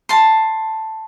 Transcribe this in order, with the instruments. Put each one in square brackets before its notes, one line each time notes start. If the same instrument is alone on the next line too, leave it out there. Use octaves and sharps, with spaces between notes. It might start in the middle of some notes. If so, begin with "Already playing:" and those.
[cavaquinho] A5 C6